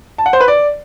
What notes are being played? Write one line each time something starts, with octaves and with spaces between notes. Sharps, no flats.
A5
F#5
C5
B4
D5